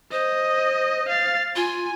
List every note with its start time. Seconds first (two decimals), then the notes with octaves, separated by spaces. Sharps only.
0.12 C5 D#5
1.09 F5 A6
1.56 F4 G#5